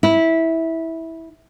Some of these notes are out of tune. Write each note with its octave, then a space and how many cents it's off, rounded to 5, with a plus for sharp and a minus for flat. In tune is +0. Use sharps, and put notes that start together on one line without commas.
E4 -15